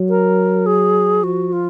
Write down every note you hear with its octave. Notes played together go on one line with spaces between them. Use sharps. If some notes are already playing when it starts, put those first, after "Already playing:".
Already playing: F#3
A#4
G#4
F3 F#4
F4